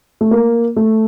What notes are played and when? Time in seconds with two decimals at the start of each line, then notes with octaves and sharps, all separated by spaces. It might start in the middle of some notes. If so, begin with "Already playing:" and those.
0.21 A3
0.31 A#3
0.76 A3